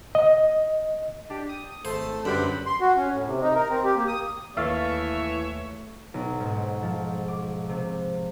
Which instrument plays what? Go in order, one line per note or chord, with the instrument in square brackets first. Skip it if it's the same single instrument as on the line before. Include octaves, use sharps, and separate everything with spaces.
[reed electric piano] D#5
[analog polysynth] D4 G4
D#6
[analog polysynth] G#1 [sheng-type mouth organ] A3 A4 [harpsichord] C5
[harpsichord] F#2 [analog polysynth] D3 G3 G4 [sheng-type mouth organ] B4 C5 B5
[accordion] C6
F#4
C#4
A2
C3
D#4
A#4
C4
G4
A#3
D#6
[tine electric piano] D#2 [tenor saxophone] E3 [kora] A3 A4 F5 [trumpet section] C#5 E5
[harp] B1
G#2
F3
D6
C3